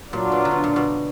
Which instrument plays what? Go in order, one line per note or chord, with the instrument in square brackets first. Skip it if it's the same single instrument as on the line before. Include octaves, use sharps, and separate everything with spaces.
[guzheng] A#2 [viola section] F#3 D4 F4
[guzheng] B2
D3
B2
A#2
B2